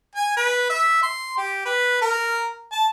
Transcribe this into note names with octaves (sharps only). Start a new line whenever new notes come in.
G#5
B4
E5
C6
G4
B4
A#4
A5